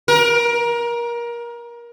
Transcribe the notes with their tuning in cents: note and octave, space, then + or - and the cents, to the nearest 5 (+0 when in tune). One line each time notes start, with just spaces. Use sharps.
A#4 +25